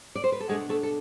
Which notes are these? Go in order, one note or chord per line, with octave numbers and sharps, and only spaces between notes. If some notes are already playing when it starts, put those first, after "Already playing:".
D5
C5
B4
A4
B2 G#3 A3 D4 G#4
A3 A4
A4